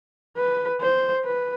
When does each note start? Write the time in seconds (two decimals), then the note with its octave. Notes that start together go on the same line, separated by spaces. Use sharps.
0.37 B4
0.81 C5
1.25 B4